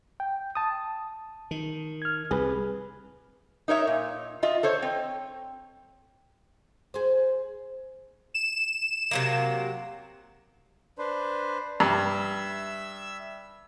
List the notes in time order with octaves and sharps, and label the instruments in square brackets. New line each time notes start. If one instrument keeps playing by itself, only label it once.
[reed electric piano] G5
A5 D#6
[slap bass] D#3
[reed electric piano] F6 G#6
[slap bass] C2 [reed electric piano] G#4 B4
[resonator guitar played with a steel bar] D#4 A#4 C#5 E5
A#2
F4 D#5 E5
A4 C5 C#5
C4
[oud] G#4 C5
[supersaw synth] E7
[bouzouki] C3 F#3 A#3
[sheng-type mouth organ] D4 B4 C5
[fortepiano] G2 [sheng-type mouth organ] E5 E6